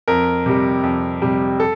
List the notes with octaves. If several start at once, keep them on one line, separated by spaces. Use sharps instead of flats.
F2 A#4
C3 G3
F2
C3 G3
A4